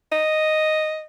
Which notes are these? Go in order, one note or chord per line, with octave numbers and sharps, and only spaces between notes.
D#5